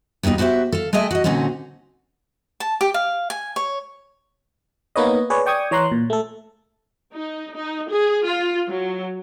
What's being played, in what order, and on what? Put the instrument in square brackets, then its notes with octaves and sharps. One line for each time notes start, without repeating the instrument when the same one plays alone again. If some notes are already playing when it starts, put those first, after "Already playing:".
[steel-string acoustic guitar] D#2 B2 G3 D#4 F4
B3 F#4 G4 C5 E5
A4 F5
G#3 A3 G#4 D#5 E5 G5
F#4 D#5
A#2 D3 C4 C#4 D#4 F#4
[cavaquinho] A5
G4
F5
G#5
C#5
[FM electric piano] A#3 B3 D#4 B4 C#5 D#5
G#4 B4 C#5 D5
D5 G5 C#6 D#6 G#6
E3 C#5 A#5 C6 F#6
A#2
A3 A4
[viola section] D#4
D#4
G#4
F4
F#3